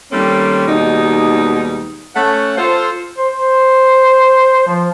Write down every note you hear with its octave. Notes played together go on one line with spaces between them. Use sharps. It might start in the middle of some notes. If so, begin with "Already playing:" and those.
D#3 G3 A3 A#3 C4 C#4
D#2 B2 G3 G#3 D#4
A3 C#4 F#5
F4 A4 C5
C5
C5
F3